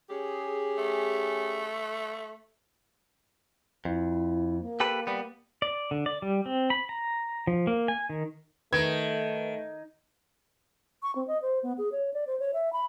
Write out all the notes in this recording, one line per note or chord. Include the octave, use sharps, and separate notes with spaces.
C#4 G4 G#4
A3
F2 E4
A#3
G4 A4 B4
G3 B3
D5
D3
D5
G3
C4
B5
A#5
F3
A#3
G#5
D#3
D#3 A3 B4 G#6
C#6
C4
D#5
C5
B3
G#4
C#5
D5
C5
C#5
E5
B5